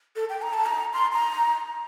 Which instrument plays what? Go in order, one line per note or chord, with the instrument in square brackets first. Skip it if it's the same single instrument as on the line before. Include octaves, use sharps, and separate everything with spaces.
[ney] A4
G5
A#5
A5
A#5
C6
A#5